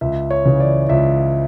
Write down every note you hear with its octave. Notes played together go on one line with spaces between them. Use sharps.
C#2 E5
C#5
C#3 E3
D5
C#2 E5